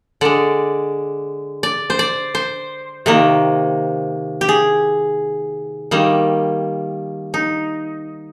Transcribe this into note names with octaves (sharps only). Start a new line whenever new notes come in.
D3 G#3 D5
D5
C5
D5
C5
C3 D#3 A#3
G4
G#4
D#3 G3 A#3
D#4